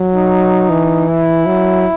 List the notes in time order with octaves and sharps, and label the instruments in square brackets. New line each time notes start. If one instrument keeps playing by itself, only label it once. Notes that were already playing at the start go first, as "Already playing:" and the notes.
Already playing: [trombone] F#3
[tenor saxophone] D#4
[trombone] E3
[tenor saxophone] E4
[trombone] F#3